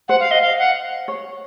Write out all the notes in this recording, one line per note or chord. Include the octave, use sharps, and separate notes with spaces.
C5 F#5
F5
D#5
F5
F#5
C#5